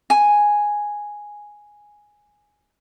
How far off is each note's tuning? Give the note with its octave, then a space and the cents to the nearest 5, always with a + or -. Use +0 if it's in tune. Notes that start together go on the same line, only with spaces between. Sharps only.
G#5 +0